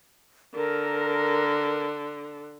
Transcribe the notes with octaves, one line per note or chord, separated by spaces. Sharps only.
D3 A#4